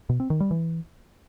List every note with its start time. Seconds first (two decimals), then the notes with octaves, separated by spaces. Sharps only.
0.09 B2
0.20 C4
0.30 D#3
0.40 G3
0.51 E3